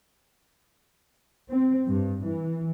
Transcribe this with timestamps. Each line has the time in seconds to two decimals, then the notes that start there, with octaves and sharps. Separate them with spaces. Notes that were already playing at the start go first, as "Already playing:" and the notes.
1.49 C4
1.87 G2
2.22 E3